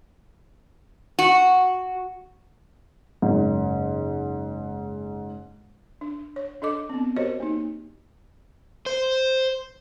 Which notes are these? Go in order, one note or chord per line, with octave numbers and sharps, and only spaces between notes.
F#4
F#1 G#2
D4
C#5
D4 A4 D#5 D6
B3 C4
F#4 G4 A#4 C5 C#5 D#5
A#3 D#4
C5